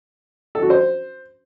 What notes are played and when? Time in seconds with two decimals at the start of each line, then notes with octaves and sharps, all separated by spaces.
0.55 A4
0.62 F#4
0.70 C5